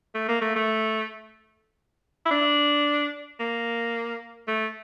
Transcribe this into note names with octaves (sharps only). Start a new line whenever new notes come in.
A3
A#3
A3
A3
E4
D4
A#3
A3